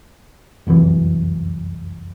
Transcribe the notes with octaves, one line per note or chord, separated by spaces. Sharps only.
F1 C2 F#2 E3